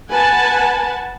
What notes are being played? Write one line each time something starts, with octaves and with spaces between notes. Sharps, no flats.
B4 F#5 G#5 A5